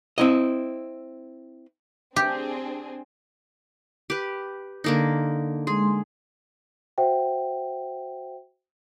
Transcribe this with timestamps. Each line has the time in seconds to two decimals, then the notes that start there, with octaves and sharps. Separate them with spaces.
0.18 C4 E4 D#5
2.16 C4 D4 G4 G#4
4.10 G4 B4
4.84 D3 A#3 D#4
5.67 G#3 G#4 C6
6.98 F#4 C5 E5 F#5 G5